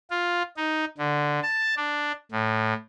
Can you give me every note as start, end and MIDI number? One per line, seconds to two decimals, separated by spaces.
0.10 0.42 65
0.57 0.85 63
0.98 1.40 50
1.43 1.75 81
1.77 2.12 62
2.32 2.74 45